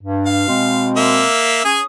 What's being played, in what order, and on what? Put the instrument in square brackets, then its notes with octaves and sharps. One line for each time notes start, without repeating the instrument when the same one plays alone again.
[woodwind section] G2
[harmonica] F5
[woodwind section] B2 G#3 C4
[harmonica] A#3 E5
[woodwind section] C#4 D#6 [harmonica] G#4 G#5